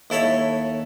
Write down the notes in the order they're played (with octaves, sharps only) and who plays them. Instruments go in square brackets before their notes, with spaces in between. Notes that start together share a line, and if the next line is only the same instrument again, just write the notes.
[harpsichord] D#2 E4 A4 C#5 B5